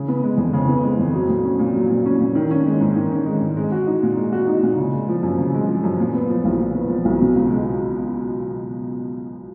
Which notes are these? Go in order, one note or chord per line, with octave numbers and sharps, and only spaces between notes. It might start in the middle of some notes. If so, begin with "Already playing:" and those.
Already playing: C#3
B3
G#3
F2
C#3
B3
G#3
F2
F#3
A#2
C#4
A#2
F#3
A#2
C#4
A#2
D#3
C#4
G#3
G#2
D#3
C#4
G#3
G#2
G#3
F#4
D#4
A#2
G#3
F#4
D#4
A#2
C#3
G#3
F3
F#2
C#3
G#3
F3
F#2
A#2
B3
F3
B1
A#2
B3
F3
B1
B2
C#2
G#3